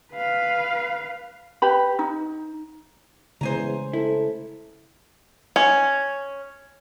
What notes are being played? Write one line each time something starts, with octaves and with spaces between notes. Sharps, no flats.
B4 F5
G4 B4 B5
D#4
E2 C#3 G#3 A3 C5 G#5 A#5
E4 A4
C#4